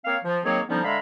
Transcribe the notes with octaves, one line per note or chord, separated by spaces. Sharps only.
A#3 C4 C#5 F5
F3
D#3 F#3 A#3 C4 G#4 C#5
D3 F3 G3 B3 C#4 D#4
D3 G#3 E5 F5 A#5 B5